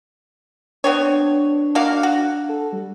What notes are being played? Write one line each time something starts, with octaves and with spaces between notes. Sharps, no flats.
B3 C4 D4 C#5
A#3 F#4 F5
F#4
A4
G3